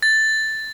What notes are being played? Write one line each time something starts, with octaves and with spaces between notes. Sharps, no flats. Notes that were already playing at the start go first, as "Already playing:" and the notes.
A6